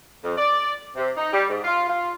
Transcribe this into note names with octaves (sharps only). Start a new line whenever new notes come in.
F2
D5
C3
D#4
G3
G#2
F4
F4